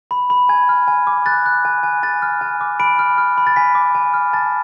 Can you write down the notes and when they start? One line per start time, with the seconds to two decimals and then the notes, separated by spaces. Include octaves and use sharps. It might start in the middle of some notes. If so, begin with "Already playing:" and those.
0.11 B5
0.30 B5
0.49 G#5 G#6
0.69 F6
0.88 G#5
1.07 D6
1.26 F#6 A6
1.46 F#6
1.65 G#5
1.83 G#5
2.03 G#5 A6
2.22 F6
2.41 G#5
2.61 D6
2.80 B5 D7
2.99 F6
3.18 F6
3.38 B5
3.47 A6
3.56 G#5 B6
3.75 D6
3.95 G#5
4.14 F6
4.33 A5 A6